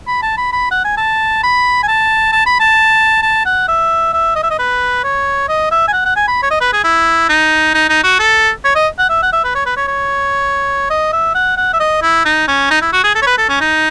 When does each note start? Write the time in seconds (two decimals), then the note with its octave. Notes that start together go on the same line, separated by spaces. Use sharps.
0.07 B5
0.22 A5
0.37 B5
0.52 B5
0.71 F#5
0.84 G#5
0.97 A5
1.43 B5
1.83 G#5
1.88 A5
2.32 A5
2.46 B5
2.60 A5
3.23 A5
3.45 F#5
3.68 E5
4.13 E5
4.36 D#5
4.43 E5
4.50 D#5
4.59 B4
5.04 C#5
5.49 D#5
5.71 E5
5.88 G#5
5.93 F#5
6.05 F#5
6.16 G#5
6.27 B5
6.43 C#5
6.51 D#5
6.61 B4
6.73 G#4
6.84 E4
7.29 D#4
7.74 D#4
7.89 D#4
8.04 F#4
8.19 A4
8.64 C#5
8.75 D#5
8.98 F#5
9.09 E5
9.22 F#5
9.32 E5
9.44 B4
9.55 C#5
9.66 B4
9.77 C#5
9.88 C#5
10.90 D#5
11.13 E5
11.35 F#5
11.57 F#5
11.73 E5
11.80 D#5
12.02 E4
12.25 D#4
12.48 C#4
12.71 D#4
12.82 E4
12.93 F#4
13.04 G#4
13.15 A4
13.22 C#5
13.26 B4
13.38 A4
13.49 C#4
13.61 D#4